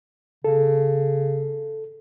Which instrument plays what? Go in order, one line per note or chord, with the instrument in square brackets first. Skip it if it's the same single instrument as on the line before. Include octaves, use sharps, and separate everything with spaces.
[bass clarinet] C#3 [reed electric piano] A4